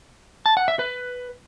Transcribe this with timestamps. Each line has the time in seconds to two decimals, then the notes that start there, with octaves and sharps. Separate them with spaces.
0.46 A5
0.57 F#5
0.68 E5
0.79 B4